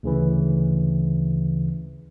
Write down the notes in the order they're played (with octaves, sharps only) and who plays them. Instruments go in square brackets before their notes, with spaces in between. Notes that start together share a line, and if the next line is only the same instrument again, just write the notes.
[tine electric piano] D2 C#3 E3